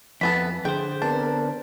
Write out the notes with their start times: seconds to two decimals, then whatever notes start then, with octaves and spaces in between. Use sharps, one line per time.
0.21 F2 E3 B3 A4 B6
0.65 D3 G#4 C5 G5
1.02 B3 C4 D4 A#4 A5